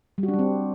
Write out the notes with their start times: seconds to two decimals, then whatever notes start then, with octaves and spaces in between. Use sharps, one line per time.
0.18 G3
0.23 F#4
0.28 D4
0.34 G3
0.39 C4